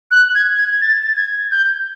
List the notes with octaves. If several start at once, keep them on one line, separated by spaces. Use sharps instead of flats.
F#6
G#6
G#6
A6
A6
G#6
G6